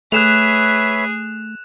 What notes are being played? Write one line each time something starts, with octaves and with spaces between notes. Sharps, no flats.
A3 G#4 B4 C#5 E5 F#6 E7 F7